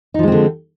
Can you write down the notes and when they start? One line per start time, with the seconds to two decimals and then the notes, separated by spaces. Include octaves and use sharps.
0.14 D#4
0.19 F3
0.23 G#3
0.28 C4
0.32 D3